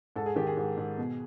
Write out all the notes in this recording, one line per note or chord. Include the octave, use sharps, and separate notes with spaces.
G#2 A4
G#4
D#3 G4
G#4
G#2
G#2
B2